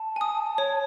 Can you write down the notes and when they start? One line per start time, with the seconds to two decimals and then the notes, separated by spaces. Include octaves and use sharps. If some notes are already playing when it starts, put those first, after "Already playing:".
Already playing: A5
0.16 G#5 D#6
0.58 C#5